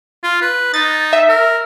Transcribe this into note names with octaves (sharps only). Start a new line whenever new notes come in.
F4
B4
D#4 A6
E5
A#4